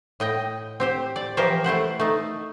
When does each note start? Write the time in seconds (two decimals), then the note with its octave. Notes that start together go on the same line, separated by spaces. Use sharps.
0.20 A2 D#5 G5
0.80 C4 G4 C5
1.16 D5
1.37 E3 F3 G4 A#4 C5 C#5
1.64 A3 E4 C5 F#5
2.00 A3 D#4